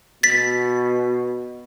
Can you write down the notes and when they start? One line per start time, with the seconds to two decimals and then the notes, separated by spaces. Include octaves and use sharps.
0.23 B2 A6 B6